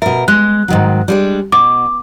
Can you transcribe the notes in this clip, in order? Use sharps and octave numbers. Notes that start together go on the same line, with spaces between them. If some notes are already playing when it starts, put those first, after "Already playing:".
B2 A#4 E5
G#3 F#6
G#2 D#3 F#3
G3 G#3 D4
B2 D6